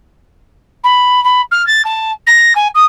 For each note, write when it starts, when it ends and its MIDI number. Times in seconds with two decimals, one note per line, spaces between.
0.83 1.22 83
1.24 1.41 83
1.51 1.65 89
1.66 1.82 93
1.85 2.11 81
2.26 2.53 94
2.55 2.68 80
2.74 2.85 87